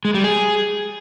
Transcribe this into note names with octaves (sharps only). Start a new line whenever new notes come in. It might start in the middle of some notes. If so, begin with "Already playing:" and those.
G#3
G3
G#4